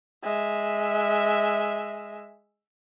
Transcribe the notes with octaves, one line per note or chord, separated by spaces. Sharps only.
G#3 E5